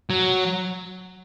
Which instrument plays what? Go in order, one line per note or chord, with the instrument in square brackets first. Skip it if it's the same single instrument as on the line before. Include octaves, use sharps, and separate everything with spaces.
[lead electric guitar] F#3